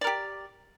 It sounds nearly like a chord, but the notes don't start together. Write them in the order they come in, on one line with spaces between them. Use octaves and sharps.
D5 A#4 G4